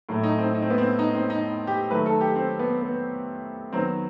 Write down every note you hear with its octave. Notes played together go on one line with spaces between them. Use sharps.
A2 F#3 A3
D#4
C4
D#4
C4
B3
C4
D#4
C4
D#4
G4
D#3 F#3 A3 B4
A4
G4
C4
B3
B3
D#3 F#3 B3 C4